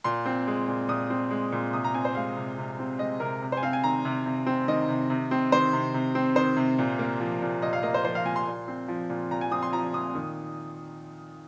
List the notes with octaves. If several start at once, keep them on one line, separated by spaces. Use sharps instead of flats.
A#2 C6
C4
G#3
A#2
A#2 D#6
C4
G#3
A#2
C3 D#6
A#5
C4 G#5
C5
G#3 F5
C3
C3
C4
G#3 D#5
C3 A#4
C3
C5
G#5
C4 F5
G#5
D#3 A#5
C3
C3
C4
D#3 D#5
C3
C3
C4
D#3 C5
C3
C3
C4
D#3 C5
C3
A#2
A#3
F3
A#2
A#2 D#5
F5
A#3 D#5
C5
F3 C5
F5
A#2 G#5
C6
A#2
C4
F3
A#2
A#2 A#5
G#5
C4 D#6
C6
F3 A#5
A#2 D#6
D#3